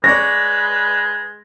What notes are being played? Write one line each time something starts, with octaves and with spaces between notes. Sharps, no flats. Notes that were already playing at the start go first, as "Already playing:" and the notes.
G#3 B4 C#5 D5 A#6